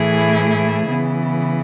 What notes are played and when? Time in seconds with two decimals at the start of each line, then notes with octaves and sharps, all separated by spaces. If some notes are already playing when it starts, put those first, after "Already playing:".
Already playing: A2 E3 A3 E4 G#4
0.90 C#3 E3 B3